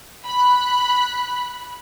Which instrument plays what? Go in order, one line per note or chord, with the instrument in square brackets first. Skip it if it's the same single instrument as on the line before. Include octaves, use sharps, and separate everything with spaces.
[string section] B5 F#6